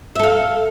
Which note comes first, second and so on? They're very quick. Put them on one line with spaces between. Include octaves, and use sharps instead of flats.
E5 A4 F5